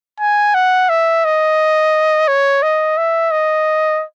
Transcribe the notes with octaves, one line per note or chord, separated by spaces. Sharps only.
G#5
F#5
E5
D#5
C#5
D#5
E5
D#5